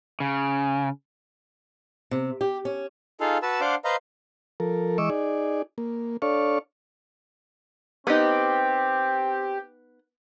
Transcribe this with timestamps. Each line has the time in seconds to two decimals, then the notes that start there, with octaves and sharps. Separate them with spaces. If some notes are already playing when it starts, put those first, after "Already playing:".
0.20 C#3
2.11 C3
2.41 G4
2.65 C#4
3.20 D#4 F4 G#4 A4 F5
3.43 F#4 B4 A5 E6
3.61 D4 C5 F5 F#5 D6
3.85 B4 C5 D#5 F5 A#5
4.60 F3 A4 A#4
4.98 E3 G#3 D#5 C#6 D6 E6
5.10 D#4 G#4 D5
5.78 A#3
6.22 D4 A4 C#5 D5 F5 C#6
8.07 B3 C4 D#4 G4